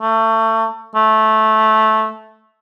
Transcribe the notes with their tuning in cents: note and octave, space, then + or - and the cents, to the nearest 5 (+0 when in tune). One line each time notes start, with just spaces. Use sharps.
A3 +25
A3 -10